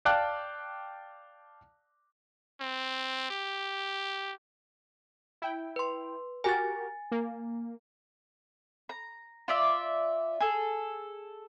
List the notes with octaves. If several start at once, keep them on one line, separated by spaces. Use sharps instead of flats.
D5 F5 G5 A5 D6 F#6
C4
G4
E4 G5
B4 C6
F#4 G4 A#4 G#5 A6
A#3
A#5
F4 D5 E5
G#4 A4